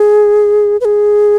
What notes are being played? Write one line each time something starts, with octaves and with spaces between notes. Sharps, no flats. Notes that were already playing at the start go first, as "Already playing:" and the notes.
Already playing: G#4
B4
G#4